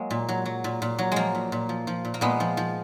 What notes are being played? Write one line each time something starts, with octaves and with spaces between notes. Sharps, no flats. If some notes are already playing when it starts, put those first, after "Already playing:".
Already playing: F#3 G#3 A#3
A#2
F#3
F#3
A#2
A#2
F#3
F3 G#3 A#3
A#2
A#2
F3
F3
A#2
A#3
A#2 G#3 B3
F3
F3